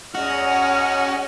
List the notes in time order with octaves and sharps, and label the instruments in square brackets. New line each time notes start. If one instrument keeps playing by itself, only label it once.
[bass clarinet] E2 [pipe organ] C#4 D#5 [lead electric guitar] F#4 [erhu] F6